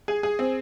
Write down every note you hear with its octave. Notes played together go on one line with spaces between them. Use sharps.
G#4
G#4
C4